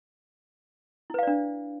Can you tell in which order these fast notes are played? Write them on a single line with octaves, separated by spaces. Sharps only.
E4 B4 F5 D5 D4